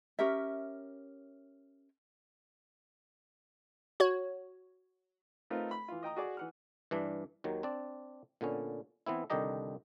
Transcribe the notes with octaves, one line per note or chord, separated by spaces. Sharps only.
C#4 G4 A#4 E5
F#4 C#5
A3 C4 D#4 F4 A#4 B4
B5
E3 F4
D#5 G5 A#5 D#6
F#4 G#4 D5
E3 F#5 F6
G2 E3 D4
D#2 D#3 F#3
C4 D4 D5
A#2 D3 B3 C#4
E3 B3 C4 E4
C2 D3 D#3 G4 D#5 A#5